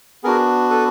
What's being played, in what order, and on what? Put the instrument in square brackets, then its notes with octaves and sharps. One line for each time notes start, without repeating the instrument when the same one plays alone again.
[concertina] B3 D4 F#4 G#4 A#4
A4 B4